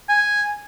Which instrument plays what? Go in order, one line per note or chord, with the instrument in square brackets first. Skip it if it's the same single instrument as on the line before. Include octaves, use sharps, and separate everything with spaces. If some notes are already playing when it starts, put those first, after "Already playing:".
[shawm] G#5